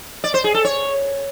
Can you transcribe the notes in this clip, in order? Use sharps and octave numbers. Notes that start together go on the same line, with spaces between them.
D5
C5
G#4
A4
C#5